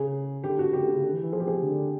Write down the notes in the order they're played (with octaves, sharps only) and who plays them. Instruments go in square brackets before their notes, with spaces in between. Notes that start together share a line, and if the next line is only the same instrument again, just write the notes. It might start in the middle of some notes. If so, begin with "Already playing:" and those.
Already playing: [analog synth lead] C#3 [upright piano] G#4
[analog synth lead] D3 [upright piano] G4
[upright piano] F#4
[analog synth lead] C#3 [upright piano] G4
[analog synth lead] D3
C#3
D3
E3
E3
[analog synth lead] F3 [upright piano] G#4
[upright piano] G4
G#4
[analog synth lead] D3